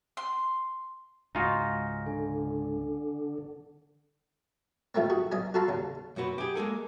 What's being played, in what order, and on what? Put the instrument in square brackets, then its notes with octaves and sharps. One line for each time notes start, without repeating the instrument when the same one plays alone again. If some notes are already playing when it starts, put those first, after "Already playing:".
[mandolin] C6
[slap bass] C#2 G#2 [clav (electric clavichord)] D#4 F4 F#4 [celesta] G#5 F6 A#6
[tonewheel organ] D3 [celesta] G#5
[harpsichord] D#3 F3 A3 A#3 C4
F#4 G#4
B1 D#5 G#5
F#4 A4 F5 A5 A#5 C6
D#2 C#3
[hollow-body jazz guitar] F#2 B2 F#4 B4
G4 G#4
G#3 A#3 G#4 A4